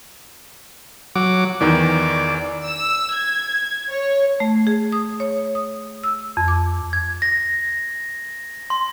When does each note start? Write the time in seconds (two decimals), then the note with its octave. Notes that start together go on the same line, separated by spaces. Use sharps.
1.15 F#3 D6
1.61 E2 D#3 E3 D5
2.65 E6
3.15 G#6
3.93 C#5
4.40 A3
4.67 G#4
4.92 D#6
5.20 C#5
5.55 D#6
6.03 E6
6.37 F2
6.48 D6
6.93 G#6
7.22 A#6
8.70 C6